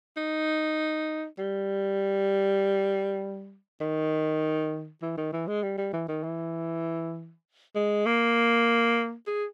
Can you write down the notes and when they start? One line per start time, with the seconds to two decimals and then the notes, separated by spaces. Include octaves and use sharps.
0.17 D#4
1.39 G3
3.81 D#3
5.02 E3
5.17 D#3
5.33 E3
5.48 G#3
5.63 G3
5.78 G3
5.93 E3
6.08 D#3
6.24 E3
7.75 G#3
8.06 A#3
9.27 G#4